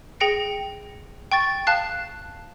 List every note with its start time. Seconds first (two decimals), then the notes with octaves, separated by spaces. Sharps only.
0.20 G#4 G5 A#6 C#7 D7
1.32 G5 C#6 A6
1.67 F5 A5 F#6 C7